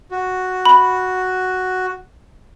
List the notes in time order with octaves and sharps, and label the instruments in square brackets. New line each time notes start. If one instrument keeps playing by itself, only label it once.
[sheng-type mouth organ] F#4
[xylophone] B5